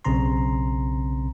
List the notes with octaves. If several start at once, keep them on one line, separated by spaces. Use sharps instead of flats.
B1 C#3 C4 A#5 C6